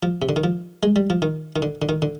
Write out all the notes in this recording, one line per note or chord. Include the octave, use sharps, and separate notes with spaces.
F3
C3
D3
D#3
F3
G#3
G3
F3
D#3
D#3
D3
D3
D#3
D3